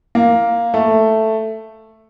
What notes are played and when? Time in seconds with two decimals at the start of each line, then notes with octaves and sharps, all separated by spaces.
0.15 A#3
0.74 A3